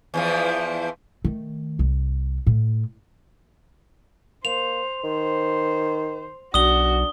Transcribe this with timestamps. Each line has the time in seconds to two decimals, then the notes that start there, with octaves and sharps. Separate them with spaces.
0.14 E2 E3 F3
1.25 D#3 A3
1.79 C2
2.47 A2
4.45 A#3 C5 F7
5.04 D#3 C5
6.54 B1 D4 F#4 D#6 G7